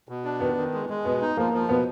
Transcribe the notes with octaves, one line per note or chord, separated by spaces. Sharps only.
B2
D4
D#3 B3
D#3
G#3
G#3
B2 B3
D#4
F3 A#3
F3
B2 B3